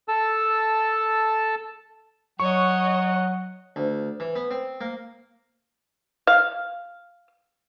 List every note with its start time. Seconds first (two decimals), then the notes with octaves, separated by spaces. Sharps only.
0.08 A4 A5 E6
2.40 F#3 C#5 D#5 F#5 C#6
3.76 D2
4.20 E3
4.36 B3
4.51 C4
4.81 A#3
6.27 F5